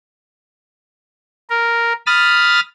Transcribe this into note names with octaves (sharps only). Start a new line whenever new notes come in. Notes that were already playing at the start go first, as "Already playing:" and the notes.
A#4
B5 D#6 F6 A6